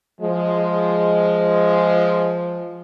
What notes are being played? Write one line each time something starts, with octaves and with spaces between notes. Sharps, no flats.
F3 G#3